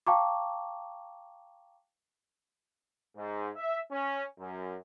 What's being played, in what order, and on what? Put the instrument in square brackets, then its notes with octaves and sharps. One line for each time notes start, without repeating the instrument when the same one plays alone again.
[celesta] F5 G5 A5 A#5 C#6 D6
[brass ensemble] G#2
E5
C#4
F#2